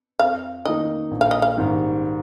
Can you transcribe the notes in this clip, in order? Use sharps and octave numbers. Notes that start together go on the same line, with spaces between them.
F2 F5
D#3 A#3 D#4 D#5
A#1
F5
D#5
F5
G#2 D#3 G3